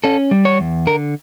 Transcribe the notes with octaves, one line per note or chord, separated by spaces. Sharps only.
C#4 A4
G3
C#5
E2
D3 A#4